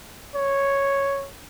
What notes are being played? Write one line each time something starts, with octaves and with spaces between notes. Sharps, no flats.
C#5